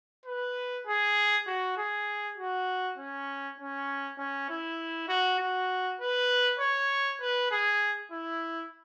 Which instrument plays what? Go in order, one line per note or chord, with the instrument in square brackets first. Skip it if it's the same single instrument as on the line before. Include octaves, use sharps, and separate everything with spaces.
[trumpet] B4
G#4
F#4
G#4
F#4
C#4
C#4
C#4
E4
F#4
F#4
B4
C#5
B4
G#4
E4